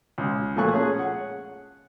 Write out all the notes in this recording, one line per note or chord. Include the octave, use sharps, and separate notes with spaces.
C#2
A#2 F3 A3 G#5 C#6 F#6
C#4 G#4
F#5